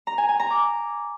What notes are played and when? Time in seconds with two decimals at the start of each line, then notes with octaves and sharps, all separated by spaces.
0.07 A#5
0.18 G#5
0.29 G#5
0.40 A#5
0.50 D6